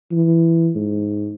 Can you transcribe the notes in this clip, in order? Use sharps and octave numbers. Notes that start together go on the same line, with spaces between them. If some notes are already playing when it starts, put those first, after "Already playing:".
E3
G#2